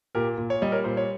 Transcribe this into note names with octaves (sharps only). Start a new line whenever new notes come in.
A#2 G4 A#4
A#2
C#5
G3 D#5
A#4 C#5
A#2 C5
C#5